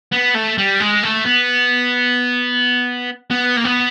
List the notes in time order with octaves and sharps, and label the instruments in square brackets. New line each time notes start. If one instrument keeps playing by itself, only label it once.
[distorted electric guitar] B3
A3
G3
G#3
A3
B3
B3
A#3
B3